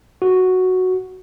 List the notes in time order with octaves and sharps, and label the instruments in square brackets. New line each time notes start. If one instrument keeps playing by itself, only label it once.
[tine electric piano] F#4